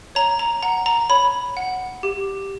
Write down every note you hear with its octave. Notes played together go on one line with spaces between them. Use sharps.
C#5 A#5
A#5
F#5 A#5
A#5
C#5 B5
F#5
G4